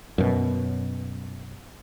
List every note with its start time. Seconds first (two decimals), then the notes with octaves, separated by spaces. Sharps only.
0.18 F#2 B2